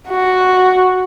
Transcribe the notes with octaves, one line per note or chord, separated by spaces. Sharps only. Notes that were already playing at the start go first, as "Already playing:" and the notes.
F#4